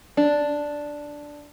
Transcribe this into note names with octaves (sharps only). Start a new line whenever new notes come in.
D4